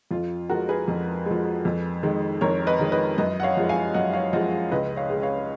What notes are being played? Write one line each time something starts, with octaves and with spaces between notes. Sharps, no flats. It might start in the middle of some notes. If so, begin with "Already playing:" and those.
F2 F4
F3 G#3 F#4 A#4
G#4 B4
F2
F3 G#3
F2
D#3 G#3
F2 A#4 C#5
B4 D#5
D#3 G#3
B4 D#5
F#2 B4 D#5
F#5
C#5 F5
F3 G#3
F5 G#5
F#2 D#5 F#5
C#5 F5
F3 G#3 D#5 F#5
C#2 B4 D#5
C#5 F5
C#3 G#3
C#5 F5